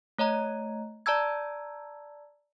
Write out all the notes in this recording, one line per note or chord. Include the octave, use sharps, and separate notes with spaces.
A3 C#5 D#5 A#5
D5 A5 A#5 E6 G#6